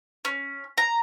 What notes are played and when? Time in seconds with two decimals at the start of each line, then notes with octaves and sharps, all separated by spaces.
0.25 C#4
0.78 A#5